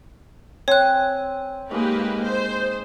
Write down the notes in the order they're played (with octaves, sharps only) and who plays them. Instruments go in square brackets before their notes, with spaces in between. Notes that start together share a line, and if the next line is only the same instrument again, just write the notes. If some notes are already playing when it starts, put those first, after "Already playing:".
[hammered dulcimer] C4 G#5 [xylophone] C#5 F#6
[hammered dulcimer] G#2 G#4 [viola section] A#3 G4 B4
[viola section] C5